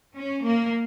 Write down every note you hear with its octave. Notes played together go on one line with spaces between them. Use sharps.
C#4
A#3